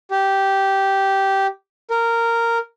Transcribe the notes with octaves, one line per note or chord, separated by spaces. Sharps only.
G4
A#4